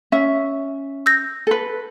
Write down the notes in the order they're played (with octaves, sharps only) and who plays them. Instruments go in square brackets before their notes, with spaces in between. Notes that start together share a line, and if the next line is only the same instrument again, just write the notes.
[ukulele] C#4 E5
[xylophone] E6 G6 A#6
[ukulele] A4 B4